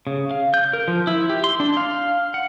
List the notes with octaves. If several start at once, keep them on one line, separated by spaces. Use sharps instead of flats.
C#3
F5
G6
A#4
F3
E4
G4
C6
D4
F5
F#5